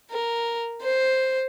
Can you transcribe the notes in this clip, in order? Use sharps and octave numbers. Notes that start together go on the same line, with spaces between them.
A#4
C5